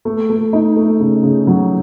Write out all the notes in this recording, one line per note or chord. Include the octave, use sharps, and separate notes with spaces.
A3
A3
D#4
A3
C#3
C#3
F#3